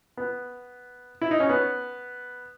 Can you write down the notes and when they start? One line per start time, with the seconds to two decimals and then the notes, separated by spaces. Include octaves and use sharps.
0.17 B3
1.21 E4
1.31 D#4
1.40 C#4
1.49 B3